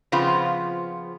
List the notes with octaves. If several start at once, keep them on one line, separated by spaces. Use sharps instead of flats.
C#3 F3 B3 C4 F4